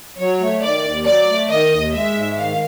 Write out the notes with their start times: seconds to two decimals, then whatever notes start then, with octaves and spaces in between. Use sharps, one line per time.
0.19 F#3 C#5
0.41 A3
0.62 D#3 D5
0.84 D#2
1.05 F#3 D5
1.27 A3
1.49 D#3 D#5
1.70 D#2
1.93 G#3 E5
2.14 G#2
2.36 D#3 F5